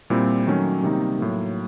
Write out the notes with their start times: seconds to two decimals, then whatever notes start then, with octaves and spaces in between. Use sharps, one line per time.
0.10 A#2 G3 C4 E4
0.47 D#3 F#3 A3 C#4
0.83 C3 D#3 G3 A#3 D#4
1.19 A2 F#3 A#3